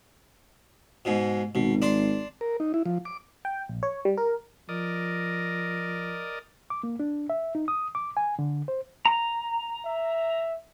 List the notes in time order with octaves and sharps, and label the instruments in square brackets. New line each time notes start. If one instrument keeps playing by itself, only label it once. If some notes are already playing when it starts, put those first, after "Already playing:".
[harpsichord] G#2 B2
[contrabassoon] G#1 [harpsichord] B2
[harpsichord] D4 C6
[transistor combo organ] A#4
D#4
E4
F3
D6
[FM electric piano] G5
A#1
C#5
G3
A#4
[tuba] F3 [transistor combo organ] A#4 D5 D#5
[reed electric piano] D6
A#3
D4
E5
D#4
D#6
D6
G#5
D3
C5
[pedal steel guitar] A#5
[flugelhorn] E5